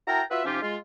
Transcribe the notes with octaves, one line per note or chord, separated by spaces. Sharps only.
E4 F#4 A#4 G5 A5 A#5
F4 F#4 B4 E5
C3 F3 C#4 D#4 F4 G4
G#3 F4